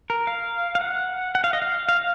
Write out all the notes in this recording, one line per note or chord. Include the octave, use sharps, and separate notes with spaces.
A#4
F5
F5
F#5
F#5
F5
D#5
F5
F5